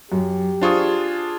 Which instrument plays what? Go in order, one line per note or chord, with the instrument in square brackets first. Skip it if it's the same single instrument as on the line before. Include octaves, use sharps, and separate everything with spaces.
[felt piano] F#2 [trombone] G4
[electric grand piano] D4 F4 G#4 [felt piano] C5 C#6 D#6